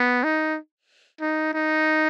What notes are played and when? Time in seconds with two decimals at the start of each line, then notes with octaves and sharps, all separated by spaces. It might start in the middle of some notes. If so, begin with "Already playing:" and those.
Already playing: B3
0.24 D#4
1.21 D#4
1.54 D#4